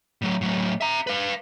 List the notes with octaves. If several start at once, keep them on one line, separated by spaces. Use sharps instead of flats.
A2 F#3
A2 F#3
E5 A#5
B4 F5